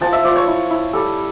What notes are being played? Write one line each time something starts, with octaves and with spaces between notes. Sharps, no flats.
F3 A5
E5
F3 D5
C#5
E4
E4
G3 A4